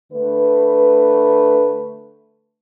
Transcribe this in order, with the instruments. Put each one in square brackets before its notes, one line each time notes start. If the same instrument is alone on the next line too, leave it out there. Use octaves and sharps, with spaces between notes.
[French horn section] D3 A3 B4